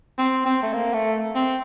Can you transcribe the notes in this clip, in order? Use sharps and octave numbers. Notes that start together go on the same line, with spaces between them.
C4
C4
A3
A#3
A3
C4